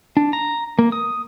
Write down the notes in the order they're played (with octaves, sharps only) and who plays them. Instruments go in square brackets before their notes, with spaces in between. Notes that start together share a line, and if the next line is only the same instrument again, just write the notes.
[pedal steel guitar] D4
A#5
A#3
D#6